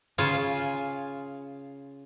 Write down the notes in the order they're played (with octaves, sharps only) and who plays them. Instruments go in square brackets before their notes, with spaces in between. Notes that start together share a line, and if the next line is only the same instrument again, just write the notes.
[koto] C#3 F4 G#5